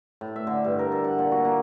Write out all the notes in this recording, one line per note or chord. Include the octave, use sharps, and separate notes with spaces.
A2
E5
D3
G2
A#4
A4
F#5
A#2
F#4
A#3